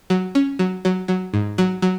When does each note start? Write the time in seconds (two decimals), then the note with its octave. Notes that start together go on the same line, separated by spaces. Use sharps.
0.10 F#3
0.35 C#4
0.59 F#3
0.85 F#3
1.08 F#3
1.34 G#2
1.58 F#3
1.82 F#3